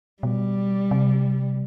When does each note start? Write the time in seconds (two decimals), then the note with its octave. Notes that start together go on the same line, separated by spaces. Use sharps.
0.23 B2 G3
0.91 C3